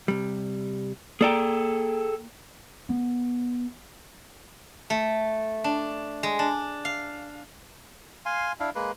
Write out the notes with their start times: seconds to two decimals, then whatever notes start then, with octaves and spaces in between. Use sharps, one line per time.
0.08 C3 G3
1.21 A#3 G#4 A4 D5 G5 A#5
2.89 B3
4.90 A3
5.64 D4
6.23 G#3
6.39 D4
6.85 F5
8.26 F5 G#5 C6
8.60 D4 E4 F5
8.75 G#3 A#3 B4